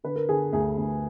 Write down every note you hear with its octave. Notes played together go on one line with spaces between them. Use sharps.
D3 B4
A#4
D3 G#4
D2 G#4
D2